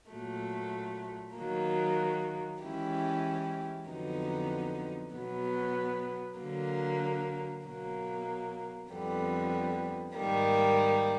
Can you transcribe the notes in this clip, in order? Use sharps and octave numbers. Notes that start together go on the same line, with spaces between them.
A#2 F#3 A3
D#3 F#3 A#3
E3 G#3 C#4 E4 G4
F2 D3 F#3 B3 D#4
B2 F#3 B3
D3 F#3 A#3
B2 F#3 A#3
F2 D3 G3 B3
G#2 D#3 G3 A#3